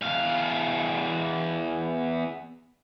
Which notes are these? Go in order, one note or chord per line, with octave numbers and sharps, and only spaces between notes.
E2 F5